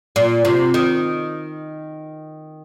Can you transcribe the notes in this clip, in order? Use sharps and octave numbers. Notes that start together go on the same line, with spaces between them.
A#2
C3
D#3